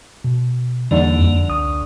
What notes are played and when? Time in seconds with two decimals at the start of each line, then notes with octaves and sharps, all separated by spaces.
0.24 B2
0.91 E2 D3 E3 G3 A#3 D#4
1.19 F2
1.50 C#2 D#6